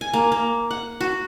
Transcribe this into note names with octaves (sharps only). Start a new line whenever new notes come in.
G#5
A#3
A#3
F#5
F#4